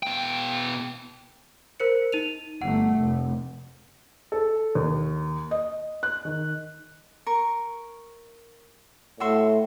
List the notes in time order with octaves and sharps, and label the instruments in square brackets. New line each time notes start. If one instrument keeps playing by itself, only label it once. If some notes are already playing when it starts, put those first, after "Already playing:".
[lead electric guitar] B2 G5
[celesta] A#4 C5 C#7
D#4 D#7 F7
[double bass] G1 A3 [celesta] F#5
[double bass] F1
[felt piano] A4
D#2
D#5
F#6
D#3
[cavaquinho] A#4 C#6
[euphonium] A2 [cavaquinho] F#4 E5 C6